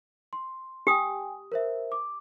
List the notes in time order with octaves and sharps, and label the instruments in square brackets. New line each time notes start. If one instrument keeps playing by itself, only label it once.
[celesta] C6
[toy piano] G4 D#6 [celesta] G5 G#5
[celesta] A#4 C5 E5
D6